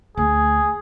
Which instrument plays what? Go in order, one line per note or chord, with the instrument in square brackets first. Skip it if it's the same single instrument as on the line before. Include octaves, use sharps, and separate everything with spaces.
[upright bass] D2 [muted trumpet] G#4